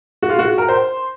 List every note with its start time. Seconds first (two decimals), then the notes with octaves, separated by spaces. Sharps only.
0.23 F#4
0.29 F4
0.39 F#4
0.58 A#4
0.69 C5